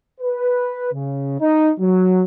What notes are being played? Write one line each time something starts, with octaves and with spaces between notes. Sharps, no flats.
B4
C#3
D#4
F#3